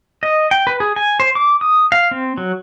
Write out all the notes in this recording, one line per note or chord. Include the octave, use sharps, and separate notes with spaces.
D#5
G5
B4
G#4
G#5
C5
D6
D#6
F5
C4
F#3